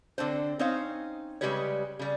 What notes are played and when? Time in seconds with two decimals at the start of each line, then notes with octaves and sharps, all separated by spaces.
0.18 D3 C4 D4 C5
0.59 C4 C#4 D#4 C5 C#5 F5
1.41 C#3 G3 G#3 G4 B4 C#5
1.99 C#3 G3